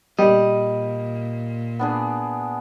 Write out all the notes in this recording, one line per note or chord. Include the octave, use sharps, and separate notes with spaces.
A#2 G3 D#5
B3 D4 G#4